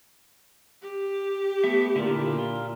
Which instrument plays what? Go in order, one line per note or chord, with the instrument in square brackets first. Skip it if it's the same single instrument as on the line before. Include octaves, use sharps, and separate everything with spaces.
[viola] G4
[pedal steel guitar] A3 B3 E5
[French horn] A#2 [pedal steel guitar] D3 E4 F4
[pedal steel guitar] F4